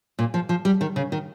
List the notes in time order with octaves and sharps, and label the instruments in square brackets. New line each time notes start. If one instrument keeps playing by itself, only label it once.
[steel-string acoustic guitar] A#2
F3
F3
G3
D#3
C#3
D#3